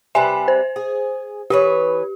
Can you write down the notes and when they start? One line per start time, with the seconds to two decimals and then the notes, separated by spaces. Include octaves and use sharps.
0.15 C3 G3 B4 E5 G#5
0.48 C5
0.76 G#4
1.50 E3 G4 B4 C#5